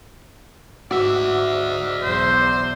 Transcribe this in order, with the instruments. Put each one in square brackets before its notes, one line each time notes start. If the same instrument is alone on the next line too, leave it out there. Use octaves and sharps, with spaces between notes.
[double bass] G#2 [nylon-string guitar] F#4 [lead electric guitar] D5 E5
[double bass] B1 E2 [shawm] C5